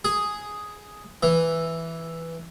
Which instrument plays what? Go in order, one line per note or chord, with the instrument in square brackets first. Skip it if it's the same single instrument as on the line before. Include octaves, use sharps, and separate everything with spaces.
[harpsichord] G#4
E3